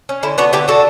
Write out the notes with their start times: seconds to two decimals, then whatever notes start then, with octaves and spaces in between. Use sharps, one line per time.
0.09 C#4
0.23 D3 E4
0.38 B3 D4 F#4
0.53 D3 E4 G4
0.68 D4 F#4 A4